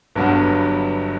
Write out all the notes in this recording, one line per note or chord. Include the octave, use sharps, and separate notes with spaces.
G1 G2 F#3 B3